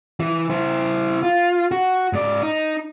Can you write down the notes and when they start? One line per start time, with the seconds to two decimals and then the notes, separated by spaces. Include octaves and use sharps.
0.20 E3
0.50 E4 C5
1.23 F4
1.71 F#4
2.13 G#2 D5
2.43 D#4